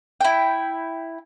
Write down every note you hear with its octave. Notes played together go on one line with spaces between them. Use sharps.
E4 G5